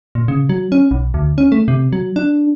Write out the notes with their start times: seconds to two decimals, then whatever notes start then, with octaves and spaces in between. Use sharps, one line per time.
0.15 A#2
0.28 C#3
0.49 F#3
0.72 C#4
0.91 B1
1.14 D2
1.38 C#4
1.52 A3
1.68 C3
1.93 F#3
2.16 D4